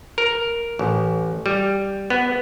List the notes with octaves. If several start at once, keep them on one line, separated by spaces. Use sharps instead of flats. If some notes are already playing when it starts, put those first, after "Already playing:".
A#4
A1
G3
B3